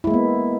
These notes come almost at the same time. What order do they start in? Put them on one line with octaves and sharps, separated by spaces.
E4 G#3 A#3 B3